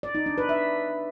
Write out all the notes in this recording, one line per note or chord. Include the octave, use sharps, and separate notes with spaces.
D5
D#4
D4
B4
E5